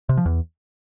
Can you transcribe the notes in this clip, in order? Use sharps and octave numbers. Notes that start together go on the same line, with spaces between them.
C3
F3
E2